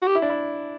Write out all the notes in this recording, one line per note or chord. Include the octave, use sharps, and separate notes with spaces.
F#4
G4
E4
D4
E4